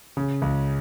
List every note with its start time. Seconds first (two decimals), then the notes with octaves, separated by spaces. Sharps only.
0.17 C#3
0.42 C#2